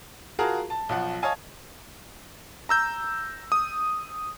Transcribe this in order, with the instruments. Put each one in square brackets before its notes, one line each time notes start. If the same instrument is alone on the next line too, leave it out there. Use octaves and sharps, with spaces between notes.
[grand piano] F4 F#4 G#4 A#4 A5 A#5
A5
B1 F3 F#5
C#5 D#5 F5 G#5 A5
[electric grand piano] A#5 E6 G6
D#6